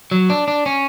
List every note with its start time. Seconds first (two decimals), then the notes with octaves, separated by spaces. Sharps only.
0.11 F#3
0.30 D4
0.48 D4
0.66 C#4